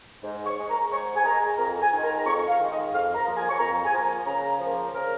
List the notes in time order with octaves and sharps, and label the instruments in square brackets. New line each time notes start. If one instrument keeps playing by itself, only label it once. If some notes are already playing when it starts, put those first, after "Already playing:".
[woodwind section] G#2
C#6
G#3
A#5
G#2 C#6
G#5
G#3 A#5
F2 A#5
G#5
D#3 G#3
A#5
A#5
F2 C#6
F5
D#3 G#3
D#5
F2 F5
A#5
F3 A#3
G#5
C#6
F2 A#5
G#5
F3 A#3 A#5
C#3 A#5
F3 A#3
C#3 A#4